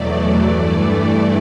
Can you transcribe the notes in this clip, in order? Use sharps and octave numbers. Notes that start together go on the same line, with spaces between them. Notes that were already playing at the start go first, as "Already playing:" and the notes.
Already playing: E2 B2 F#3 A3 D5
G2 E3 A3